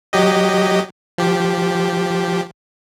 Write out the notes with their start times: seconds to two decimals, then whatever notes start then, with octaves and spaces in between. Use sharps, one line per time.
0.13 F#3 G4 D#5
1.18 F3 G4